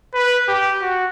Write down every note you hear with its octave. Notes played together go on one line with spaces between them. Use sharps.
B4
G4
F#4